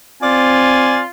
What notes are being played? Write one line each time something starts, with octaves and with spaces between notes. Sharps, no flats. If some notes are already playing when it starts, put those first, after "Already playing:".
C4 F4 D5 G#5